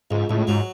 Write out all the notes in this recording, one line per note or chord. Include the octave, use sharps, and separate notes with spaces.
C#2 G#2
C#2 A2
G#2 F#3